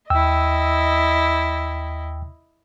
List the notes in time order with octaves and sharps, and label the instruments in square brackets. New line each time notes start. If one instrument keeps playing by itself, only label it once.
[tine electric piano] D#2 G5 E6 [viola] E4 D#5